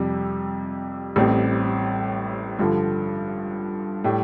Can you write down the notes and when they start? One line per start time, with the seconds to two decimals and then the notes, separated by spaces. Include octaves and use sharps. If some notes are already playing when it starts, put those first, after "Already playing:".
Already playing: F2 C3 G3
1.16 A1 A2 G3 C4
2.59 G2 D3 F3
4.04 A2 G3